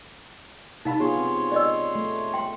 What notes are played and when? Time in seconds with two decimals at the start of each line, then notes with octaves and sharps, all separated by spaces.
0.85 C3 D#4 F5 A5 B5
1.00 B3 F4 G#4 C#5 C6
1.18 C4
1.52 D5 D#5 E6
1.95 A3
2.34 G5 C6